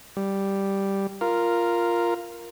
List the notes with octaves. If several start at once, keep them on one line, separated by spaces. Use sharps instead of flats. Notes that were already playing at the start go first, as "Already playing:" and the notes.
G3
F4 A#4